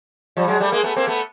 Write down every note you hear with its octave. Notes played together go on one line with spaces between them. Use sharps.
F3 G3
F#3 G#3
G3 A3
G#3 A#3
A3 B3
A#3 C4
A3 B3